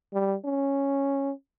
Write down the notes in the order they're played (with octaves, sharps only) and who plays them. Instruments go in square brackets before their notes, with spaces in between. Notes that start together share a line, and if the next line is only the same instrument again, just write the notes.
[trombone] G3
C#4